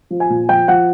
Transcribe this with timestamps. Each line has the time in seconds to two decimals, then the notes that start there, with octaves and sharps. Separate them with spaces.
0.11 F3
0.20 G#5
0.30 A#2
0.49 F3 G5
0.68 F3 F#5